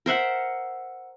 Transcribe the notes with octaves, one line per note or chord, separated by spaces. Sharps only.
A#4 C5 E5 F#5